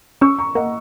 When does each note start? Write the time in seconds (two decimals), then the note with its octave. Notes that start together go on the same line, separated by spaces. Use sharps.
0.21 C#4 C#6 E6
0.38 A#5 C#6
0.55 A#3 D#5 F#5